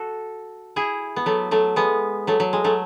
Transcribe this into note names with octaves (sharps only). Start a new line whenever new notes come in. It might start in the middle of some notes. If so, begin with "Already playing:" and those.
Already playing: F#4 A4
E4 G#4
B3
F#3 A3
F#3 A3
G#3 B3
F#3 A3
F#3
G#3
F#3 A3